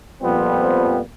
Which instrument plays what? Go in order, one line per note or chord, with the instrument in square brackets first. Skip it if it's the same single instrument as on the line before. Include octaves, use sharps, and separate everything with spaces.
[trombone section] F2 A#2 F3 G3 B3 C4